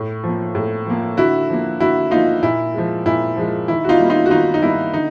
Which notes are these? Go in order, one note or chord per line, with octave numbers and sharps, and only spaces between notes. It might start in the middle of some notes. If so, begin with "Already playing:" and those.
Already playing: A2
F3 A#3
A2
F3 A#3
D3 E4 F#4
F3 A#3
D3 E4 F#4
F3 A#3 D#4 F4
A#2 E4
F3 G#3
A#2 E4
F3 G#3
D#3 E4
F#4
D#4 F4
G3 A#3
D#4 F4
F#4
D#3 D#4 F4
D#4
G3 A#3 E4
D3 D#4